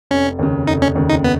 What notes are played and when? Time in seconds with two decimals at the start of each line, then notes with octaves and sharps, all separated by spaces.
0.11 F1 C#4
0.39 D#2 C#3
0.67 F1 D#4
0.82 C#4
0.95 D#2 C#3
1.09 D#4
1.24 B3